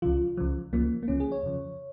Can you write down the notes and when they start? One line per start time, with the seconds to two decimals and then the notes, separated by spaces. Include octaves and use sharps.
0.02 C#2 C#3 F3 F4
0.37 C#2 C#3 F3
0.73 C#2 C#3 F3 A#3
1.03 A#3
1.08 C#2 C#3 F3 C#4
1.20 G#4
1.32 C#5
1.43 F2 C#3 F3